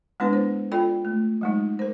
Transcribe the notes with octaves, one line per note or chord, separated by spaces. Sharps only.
G#3 B3 D4 E4 B4
C5
F4 A4 D5 G5 B5
A3
F#3 G#3 D#4
A#4 C5